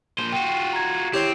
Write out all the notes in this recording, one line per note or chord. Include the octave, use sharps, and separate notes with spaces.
A#2 C5
F4 F#4 G5
A#5 G#6
C4 E4 G4 C#5